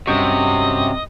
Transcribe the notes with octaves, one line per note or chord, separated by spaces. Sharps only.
G2 C3 C#4 F#4 D#5 G5 C#6